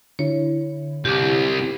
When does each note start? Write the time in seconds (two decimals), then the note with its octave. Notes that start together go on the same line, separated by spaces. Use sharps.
0.19 D3 E4 C#5
1.05 C2 G4 D6